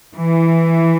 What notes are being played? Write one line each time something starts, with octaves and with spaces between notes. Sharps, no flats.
E3